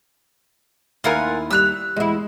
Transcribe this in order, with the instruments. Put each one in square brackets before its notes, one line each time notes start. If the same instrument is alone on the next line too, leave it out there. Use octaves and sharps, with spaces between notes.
[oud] D#2 E4 A#4 [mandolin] F4 F#5 G#5
[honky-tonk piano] G3 F7 [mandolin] E6 F#6
[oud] E2 E4 [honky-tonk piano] G#3